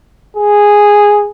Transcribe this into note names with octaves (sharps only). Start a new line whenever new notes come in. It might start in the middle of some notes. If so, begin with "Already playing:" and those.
G#4